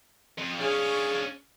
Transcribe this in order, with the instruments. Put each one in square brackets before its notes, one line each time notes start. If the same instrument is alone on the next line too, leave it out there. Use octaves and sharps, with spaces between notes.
[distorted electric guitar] F2
[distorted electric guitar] C#4 D4 [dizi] G#4 [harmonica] C#5 F5 G#5